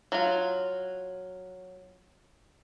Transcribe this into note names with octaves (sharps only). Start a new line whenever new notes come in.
F#3 F4